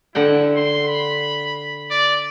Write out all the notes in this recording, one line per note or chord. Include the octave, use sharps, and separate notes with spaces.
D3 E4 F#5 G5
C6
B5
D5